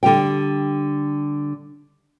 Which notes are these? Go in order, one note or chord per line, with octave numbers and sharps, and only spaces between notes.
D3 G3 G4 G5